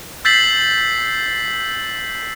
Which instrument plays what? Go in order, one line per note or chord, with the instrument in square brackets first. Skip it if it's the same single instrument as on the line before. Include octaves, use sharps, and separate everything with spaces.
[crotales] E6 G6 A6 B6 C7 F#7